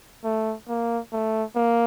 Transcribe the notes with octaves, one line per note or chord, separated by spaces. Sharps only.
A3
A#3
A3
A#3